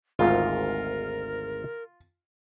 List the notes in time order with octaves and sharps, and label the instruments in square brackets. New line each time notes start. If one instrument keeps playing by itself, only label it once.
[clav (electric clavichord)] G#1 D2 G#2 [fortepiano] F4 [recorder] A#4